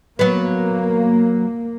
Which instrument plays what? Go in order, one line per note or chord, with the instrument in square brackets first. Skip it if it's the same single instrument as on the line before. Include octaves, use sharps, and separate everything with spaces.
[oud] F#3 B3 [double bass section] A#3